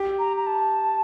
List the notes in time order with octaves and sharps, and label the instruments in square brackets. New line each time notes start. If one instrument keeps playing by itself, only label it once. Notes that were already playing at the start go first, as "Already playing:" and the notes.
Already playing: [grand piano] G4
[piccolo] A#5
A#5
A5